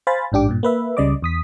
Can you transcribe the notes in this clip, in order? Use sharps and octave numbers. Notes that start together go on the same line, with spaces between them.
C5 F5 G#5 B5 A6
A1 G#2 D4 G4 D6
G2 A#2
A#3 B4 E5
C#2 C#3 G3 D5 D#5 D6
E2 D#6 B6